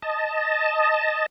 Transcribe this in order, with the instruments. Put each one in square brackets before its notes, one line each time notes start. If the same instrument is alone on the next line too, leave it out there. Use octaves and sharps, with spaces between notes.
[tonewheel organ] D#5 A5